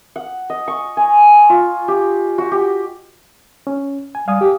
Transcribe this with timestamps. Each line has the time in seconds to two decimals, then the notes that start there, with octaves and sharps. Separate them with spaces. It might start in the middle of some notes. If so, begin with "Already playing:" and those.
0.16 F#5
0.50 D#5
0.68 C#6
0.97 G#5
1.50 F4
1.88 G4
2.38 F#4
2.52 G4
3.67 C#4
4.15 G#5
4.28 G3 F5 G#5 D#6
4.40 G4